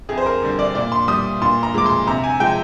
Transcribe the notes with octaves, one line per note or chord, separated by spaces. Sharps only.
F2 G#4
C5
A#4
D3 G3
D5
A#2 D5
C6
G3 D#6
A#2 C6
A#5
F3 G#3 D6
C6
C3 A#5
G#5
F3 G#3 G5